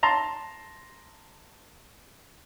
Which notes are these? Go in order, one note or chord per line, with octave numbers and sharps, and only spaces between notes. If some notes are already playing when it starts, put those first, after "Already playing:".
A5 A#5 C6